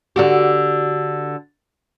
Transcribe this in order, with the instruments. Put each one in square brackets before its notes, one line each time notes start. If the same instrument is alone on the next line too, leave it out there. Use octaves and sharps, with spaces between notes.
[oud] D3 F#4 G4